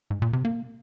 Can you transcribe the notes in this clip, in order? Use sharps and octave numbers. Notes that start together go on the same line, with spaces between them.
G#2
A#2
C3
A#3